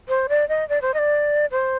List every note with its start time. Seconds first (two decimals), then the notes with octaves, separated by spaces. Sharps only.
0.08 C5
0.29 D5
0.49 D#5
0.69 D5
0.82 C5
0.94 D#5
0.99 D5
1.51 C5